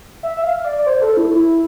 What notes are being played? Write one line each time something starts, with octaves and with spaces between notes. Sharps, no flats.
E5
E5
F5
D5
D5
C5
A4
E4
E4